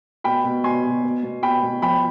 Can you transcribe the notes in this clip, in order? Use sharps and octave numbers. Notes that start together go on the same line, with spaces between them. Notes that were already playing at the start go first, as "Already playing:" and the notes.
B2 G5 B5
B2
B2 G#5 C6
B2
B2
B2
B2 G5 B5
B2
F3 G5 B5